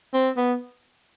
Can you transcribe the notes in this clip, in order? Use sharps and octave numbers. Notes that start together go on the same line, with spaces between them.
C4
B3